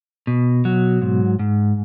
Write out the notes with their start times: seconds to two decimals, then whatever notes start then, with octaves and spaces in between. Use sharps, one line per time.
0.27 B2
0.65 F#3
1.02 G#2
1.39 G#2